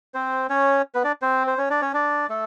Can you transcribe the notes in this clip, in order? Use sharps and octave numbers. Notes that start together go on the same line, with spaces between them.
C4 C5
C#4 C#5
B3 B4
D4 D5
C4 C5
C5
C#4 C#5
D4 D5
C#4 C#5
D4 D5
A3 A4